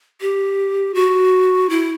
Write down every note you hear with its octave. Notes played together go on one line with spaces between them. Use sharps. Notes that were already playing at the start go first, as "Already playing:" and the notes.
G4
F#4
E4